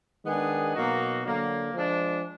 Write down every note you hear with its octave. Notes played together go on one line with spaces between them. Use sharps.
D#3 G#3 B3 D4 G#4
B2 F#3 A#3 D#4 F#4
D3 F#3 A#3
F3 G#3 D4